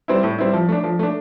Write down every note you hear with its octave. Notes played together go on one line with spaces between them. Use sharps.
G3 C4 E4
A2
G3 C4 E4
F3
A3 D4
F3
A3 D4